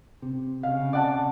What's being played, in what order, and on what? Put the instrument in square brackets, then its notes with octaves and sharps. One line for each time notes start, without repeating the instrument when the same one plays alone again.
[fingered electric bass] C3
[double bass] C#3 [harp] F5
[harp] D5 F#5 A5